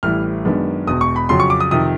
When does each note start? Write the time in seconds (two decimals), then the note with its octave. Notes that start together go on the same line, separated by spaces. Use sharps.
0.03 A1 A2 E3 G3 F6
0.45 F#2 D#3 G#3 B3 D4
0.87 E1 E2 B2 D#6
1.01 C#6
1.16 B5
1.29 F2 C#3 F#3 C6
1.40 C#6
1.50 D6
1.60 D#6
1.71 F2 C3 D#3 D#6